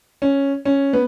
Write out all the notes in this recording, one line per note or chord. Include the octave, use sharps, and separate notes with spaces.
C#4
C#4
B3